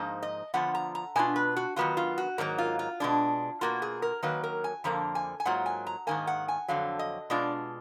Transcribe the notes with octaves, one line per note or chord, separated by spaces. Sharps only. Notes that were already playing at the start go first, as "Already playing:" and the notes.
Already playing: G#2 F3 A#3 D#4
D#5
D3 F3 B3 F4 F#5
A#5
A#5
B2 A#3 D4 F4 G#5
B4
F#4
D#3 F#3 B3 F4 F#4
F4
F#4
G#2 D#3 F#3 A#3 A#4
F4
F4
B2 G#3 D4
B2 A#3 F4 F#4
G#4
A#4
D#3 F#3 A#3 B4
A#4
G#5
F2 D3 F3 A#3 A#5
G#5
G#5
G#2 F#3 A#3 F4 F#5
G#5
A#5
G#2 D#3 A#3 G#5
F#5
G#5
F2 D3 F#3 F5
D#5
B2 G#3 D4 F4 D5